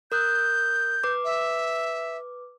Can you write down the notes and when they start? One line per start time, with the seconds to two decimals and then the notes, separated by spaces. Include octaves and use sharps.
0.12 A#4 D#6 F#6 G6
1.03 B4 D6
1.24 E5